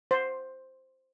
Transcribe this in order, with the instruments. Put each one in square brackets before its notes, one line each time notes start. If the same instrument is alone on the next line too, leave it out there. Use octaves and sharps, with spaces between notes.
[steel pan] C5